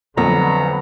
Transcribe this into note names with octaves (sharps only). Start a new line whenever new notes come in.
F2 D3 F#3 B3 A#5